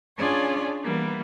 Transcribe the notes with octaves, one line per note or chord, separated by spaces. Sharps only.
C#4 D4 F4 G#4 C#5 D5
E3 G3 A#3 B3